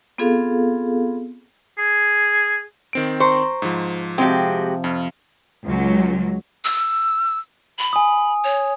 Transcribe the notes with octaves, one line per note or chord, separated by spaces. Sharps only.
B3 C4 F4 G#4 A4 F5
G#4
D#3 C4 D7
C5 A#5 C6 C#6
G#2 F3
C3 F3 G#3 F#4 G4 G5
F2 F4
C#2 F#3
E6
B5
G#5 D#6
C#5